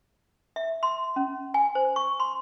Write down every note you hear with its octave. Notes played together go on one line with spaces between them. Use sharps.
E5
C6
C#4
G#5
C5
C#6
C6